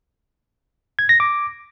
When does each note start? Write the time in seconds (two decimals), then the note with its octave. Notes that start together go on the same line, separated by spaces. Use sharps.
0.99 G#6
1.09 A#6
1.20 D6